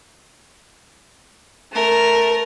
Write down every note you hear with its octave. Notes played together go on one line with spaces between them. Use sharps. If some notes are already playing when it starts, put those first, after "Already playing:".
A3 A#4